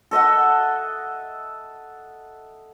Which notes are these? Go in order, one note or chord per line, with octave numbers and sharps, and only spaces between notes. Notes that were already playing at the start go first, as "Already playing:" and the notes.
A4 D#5 E5 F#5